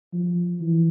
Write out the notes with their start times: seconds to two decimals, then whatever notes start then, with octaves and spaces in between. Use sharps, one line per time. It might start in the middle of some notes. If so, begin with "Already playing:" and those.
0.13 F3
0.60 E3